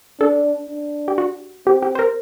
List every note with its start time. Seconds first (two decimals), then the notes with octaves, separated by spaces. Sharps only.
0.21 D4 A4
0.69 D4
1.08 G4
1.18 F#4
1.66 C4 G4
1.83 G4
1.95 C5
1.99 A#4